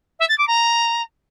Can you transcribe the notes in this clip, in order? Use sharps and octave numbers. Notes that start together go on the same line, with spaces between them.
E5
A6
D6
A#5